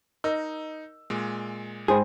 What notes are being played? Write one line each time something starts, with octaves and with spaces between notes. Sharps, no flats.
D#4 A#4 D#5 E6
A#2 G#3
G#2 G#4 C5 G5 G#5 B5